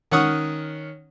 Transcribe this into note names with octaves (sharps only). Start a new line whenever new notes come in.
D#3 C#4 F#5 C#6 D#6 F6